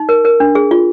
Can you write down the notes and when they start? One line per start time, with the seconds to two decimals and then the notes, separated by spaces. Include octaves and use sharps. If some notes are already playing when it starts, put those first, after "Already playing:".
Already playing: D#4
0.09 A#4
0.25 A#4
0.40 D4
0.55 G#4
0.71 F4